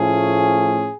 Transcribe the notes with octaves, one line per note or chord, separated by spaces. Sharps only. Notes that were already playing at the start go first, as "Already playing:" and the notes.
Already playing: A2 F3 A3 C#4 G#4